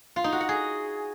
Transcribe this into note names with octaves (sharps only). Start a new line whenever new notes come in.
F4
D#4
F#4
F#5
G#4